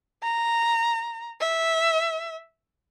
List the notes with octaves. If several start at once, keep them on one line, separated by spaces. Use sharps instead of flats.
A#5
E5